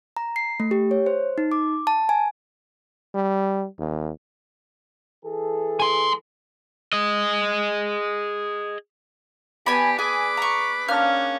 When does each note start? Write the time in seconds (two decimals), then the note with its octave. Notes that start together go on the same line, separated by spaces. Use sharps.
0.17 A#5
0.36 C7
0.60 A3
0.71 G4
0.91 C#5
1.06 C5
1.38 D#4
1.52 D6
1.87 A5
2.09 G#5
3.14 G3
3.78 D#2
5.25 E3 G#4 A4
5.80 G#5 C6
6.93 G#4 D#5
9.66 B3 G4 D5 G#5 A5 B5
9.99 G#4 B4 G#5 D6
10.37 A#5 C#6
10.88 A#3 C#4 D4 F6